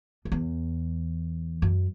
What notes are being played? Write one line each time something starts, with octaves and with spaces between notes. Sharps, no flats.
F#2
E2
F#2